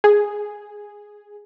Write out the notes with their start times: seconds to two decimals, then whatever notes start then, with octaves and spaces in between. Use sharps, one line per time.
0.04 G#4